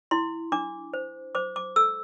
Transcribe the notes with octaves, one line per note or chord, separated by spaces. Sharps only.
E4 C6
D4 D6
C5
C5 D6
D6
A4 E6